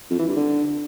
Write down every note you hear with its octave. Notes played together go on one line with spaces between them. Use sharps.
F2
E3
G2
D3